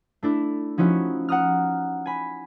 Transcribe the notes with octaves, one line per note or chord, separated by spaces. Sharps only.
A3 D4 E4
F3 C#4 D#4 E4 F#4
F#5 A#5 D#6 F6
G#5 B5